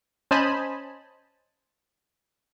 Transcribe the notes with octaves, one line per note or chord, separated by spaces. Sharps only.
C#4 C5 D#5 G#5 A5 B5